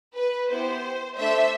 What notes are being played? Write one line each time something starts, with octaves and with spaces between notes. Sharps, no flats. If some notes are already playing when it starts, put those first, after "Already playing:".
B4
B3 E4 G4 C5
A3 D4 A4 C5 E5